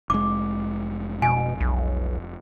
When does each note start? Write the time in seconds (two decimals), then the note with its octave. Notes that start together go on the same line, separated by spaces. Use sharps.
0.10 F1 G#3 D6
1.22 B2 G#5
1.60 B1